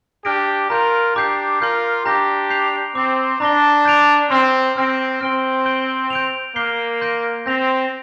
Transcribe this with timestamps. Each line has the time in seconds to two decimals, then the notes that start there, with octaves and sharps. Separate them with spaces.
0.24 D4 G4 F6 A#6 D7
0.70 F4 A#4 A#5 G6 D7 F7
1.15 D4 G4 A#5 D6 G6 C7
1.60 F4 A#4 C6 G6 C7
2.05 D4 G4 A#5 G6 A#6
2.50 G6 C7 F7
2.95 C4 D6 G6 C7
3.40 D4 A#5 D6 A#6 G7
3.85 G6 D7 F7
4.30 C4 C6 F6 C7
4.75 C4 C6 F6 A#6 D7
5.21 C4 F6 D7 G7
5.66 G6 D7 G7
6.10 G6 D7 F7
6.55 A#3 G6 C7 G7
7.01 C6 G6 A#6 D7
7.46 C4 G6 A#6 F7